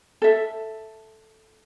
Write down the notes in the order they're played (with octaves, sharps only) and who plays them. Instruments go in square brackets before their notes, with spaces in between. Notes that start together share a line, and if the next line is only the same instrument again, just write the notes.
[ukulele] A4 E5